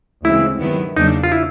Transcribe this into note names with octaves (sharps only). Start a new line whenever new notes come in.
D2 C#3 E3 G#3 C4 E4
G2 D#3 F#3 B3 E4
E2 C#3 F#3 A#3 D4 D#4
F4
E4